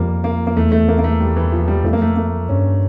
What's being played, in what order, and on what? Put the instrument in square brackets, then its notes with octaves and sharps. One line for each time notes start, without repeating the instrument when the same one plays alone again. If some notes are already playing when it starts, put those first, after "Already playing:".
Already playing: [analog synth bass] F2 [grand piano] G3 A#3
[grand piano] A#3
A#3
[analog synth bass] E2 [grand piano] A3
[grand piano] A3
A#3
A#3
A3
G3
E3
F3
G3
[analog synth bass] F2 [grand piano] A3
[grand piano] A#3
A3
A#3
[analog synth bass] G2 [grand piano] C#4